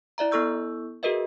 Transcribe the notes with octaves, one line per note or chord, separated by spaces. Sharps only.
E4 D5 E5 A#5
B3 E4 A4 C#6 E6 G6
F#4 G#4 A#4 B4 D#5 E5